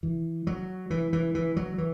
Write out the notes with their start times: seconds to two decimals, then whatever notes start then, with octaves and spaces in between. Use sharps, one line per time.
0.03 E3
0.47 F#3
0.90 E3
1.13 E3
1.35 E3
1.56 F#3
1.78 E3